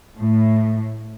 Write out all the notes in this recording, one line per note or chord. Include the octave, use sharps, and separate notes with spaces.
A2